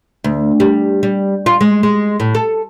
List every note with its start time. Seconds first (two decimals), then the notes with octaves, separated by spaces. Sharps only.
0.24 D2
0.60 G3
1.03 G3
1.46 F4
1.61 G#3
1.83 G#3
2.20 A2
2.35 A4